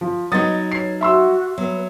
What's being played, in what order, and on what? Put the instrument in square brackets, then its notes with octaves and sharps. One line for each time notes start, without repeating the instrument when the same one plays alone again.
[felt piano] F3
[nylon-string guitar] F#3 B3 D#4 [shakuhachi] D#5 [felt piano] D#6 A6
[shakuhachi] C#5 [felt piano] C7
[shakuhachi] F#4 [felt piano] E5 C6 E6
[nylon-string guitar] F#3 [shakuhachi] B3